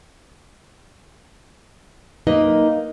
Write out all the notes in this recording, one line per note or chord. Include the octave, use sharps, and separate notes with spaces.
A#3 D#4 A#4 B4 D#5